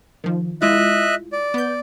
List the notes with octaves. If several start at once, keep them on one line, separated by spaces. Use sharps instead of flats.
D#3 F3
G#3 E4 F4 D#5 E5 F#6
D5
B3 G6